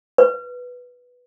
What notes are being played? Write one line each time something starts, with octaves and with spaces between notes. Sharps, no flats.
B4